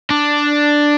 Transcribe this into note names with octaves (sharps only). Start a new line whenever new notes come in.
D4